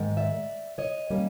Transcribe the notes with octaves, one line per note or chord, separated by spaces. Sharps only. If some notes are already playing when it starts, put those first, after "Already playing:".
Already playing: G#2 D#3 G#3
D5 E5
C#5 D#5
D#3 G3 A#3 C#4